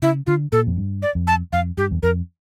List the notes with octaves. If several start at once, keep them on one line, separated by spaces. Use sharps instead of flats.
C#3 E4
D3 F4
A#2 A4
F2
G2
D5
F2
A5
F2 F5
G2 G4
E2
F2 A#4